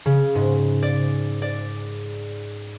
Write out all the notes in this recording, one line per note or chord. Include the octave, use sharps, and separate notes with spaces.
C#3
G#2
D5
D5